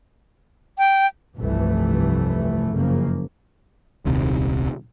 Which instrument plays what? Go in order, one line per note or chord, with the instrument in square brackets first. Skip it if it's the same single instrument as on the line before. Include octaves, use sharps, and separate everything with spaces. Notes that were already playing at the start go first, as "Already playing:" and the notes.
[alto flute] G5
[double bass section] F1 C2 G2 C3 E3 A3
F#1 C#3 F3 A#3
[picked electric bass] D#1 C2 C3 D#3